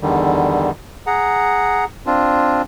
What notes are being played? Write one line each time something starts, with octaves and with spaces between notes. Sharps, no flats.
E2 D3 D#3 G3
G#4 F#5 A#5
C4 D4 F4